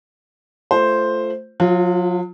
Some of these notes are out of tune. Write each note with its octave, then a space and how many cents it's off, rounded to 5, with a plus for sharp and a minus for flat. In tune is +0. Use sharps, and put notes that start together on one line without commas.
A3 +0 F4 -15 C5 +0
F#3 -40 F4 +0